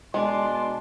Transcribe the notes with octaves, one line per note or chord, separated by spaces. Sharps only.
B2 G#3 D4 C6